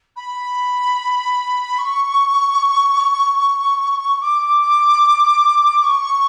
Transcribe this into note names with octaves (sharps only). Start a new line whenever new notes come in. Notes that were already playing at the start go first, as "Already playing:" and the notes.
B5
C#6
D6
C#6